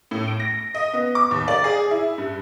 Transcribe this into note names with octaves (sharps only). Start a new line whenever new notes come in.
A2
D7
A#6
D#5
B3
D6
D#2
D5
G#4
E4
G2